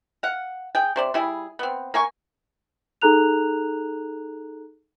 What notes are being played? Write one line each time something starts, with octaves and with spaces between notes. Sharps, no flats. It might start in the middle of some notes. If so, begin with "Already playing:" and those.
F5 F#5
G#4 G5
C3 C5 D5
G3 E4 G#4
B3 C4
A#3 G#5 C#6
D#4 G#4 A4 A#5 F#6 F7